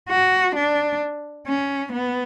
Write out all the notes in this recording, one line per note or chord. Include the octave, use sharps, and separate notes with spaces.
F#4
D4
C#4
B3